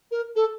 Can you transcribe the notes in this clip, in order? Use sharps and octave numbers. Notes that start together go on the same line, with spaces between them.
A#4
A4